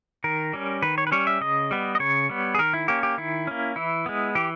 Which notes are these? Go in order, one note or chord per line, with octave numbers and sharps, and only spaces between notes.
D#3 A#4
G3 C#4
D#3 B4
C#5
B4
G3 C#4 C#5
E5
C#3 D#5
G3 B3
D#5
C#3 C#5
G3 B3
G#4
D#3 A#4
E4
A#3 C#4 G4
G4
D#3 E4
A#3 C#4
E3 E4
G#3 B3
E3 G4